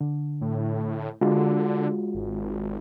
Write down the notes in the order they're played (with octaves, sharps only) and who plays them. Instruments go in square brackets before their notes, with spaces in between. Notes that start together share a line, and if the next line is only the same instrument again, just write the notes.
[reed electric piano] D3
[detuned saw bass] A2
[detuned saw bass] D3 [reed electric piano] G#3 F4 F#4
[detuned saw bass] G#1